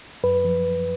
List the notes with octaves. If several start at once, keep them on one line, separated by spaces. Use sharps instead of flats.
F#2 B4
F3